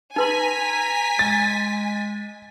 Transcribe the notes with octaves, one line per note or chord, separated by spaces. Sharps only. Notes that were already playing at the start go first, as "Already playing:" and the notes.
D#4 B4 G#5 A#5 C6 B6
G#3 A6